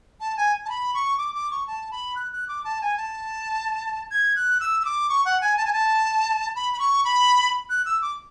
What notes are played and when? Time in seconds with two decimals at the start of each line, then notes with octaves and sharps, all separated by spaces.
0.20 A5
0.37 G#5
0.65 A5
0.69 B5
0.94 C#6
1.18 D6
1.35 D6
1.51 C#6
1.67 A5
1.91 B5
2.16 F#6
2.33 F#6
2.49 D6
2.64 A5
2.82 G#5
2.97 A5
4.11 G#6
4.36 F#6
4.60 E6
4.81 E6
4.85 D6
5.09 C#6
5.25 F#5
5.41 G#5
5.57 A5
5.65 G#5
5.73 A5
6.55 B5
6.73 B5
6.79 C#6
7.05 B5
7.70 F#6
7.86 E6
8.02 D6